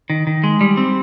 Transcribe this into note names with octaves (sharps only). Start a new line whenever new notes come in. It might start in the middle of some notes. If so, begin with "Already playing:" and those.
D#3
D#3
G#3
G3
C4